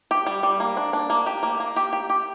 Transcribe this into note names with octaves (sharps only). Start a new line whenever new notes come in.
G4
G3
G3
A#3
D4
D4
A#3
G4
A#3
A#3
G4
G4
G4